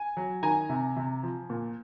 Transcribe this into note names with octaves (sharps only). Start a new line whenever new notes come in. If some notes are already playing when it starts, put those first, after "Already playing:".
Already playing: G#5
F#3
D#3 G#5 A#5
C3
C3
F3
A#2